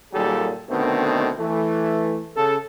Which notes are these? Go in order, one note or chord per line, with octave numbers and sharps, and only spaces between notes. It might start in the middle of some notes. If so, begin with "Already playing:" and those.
D#2 A#2 F#3 G3 G#4 A4
B2 D3 D#3 A3 B3 C4
E3 A3
C#3 A4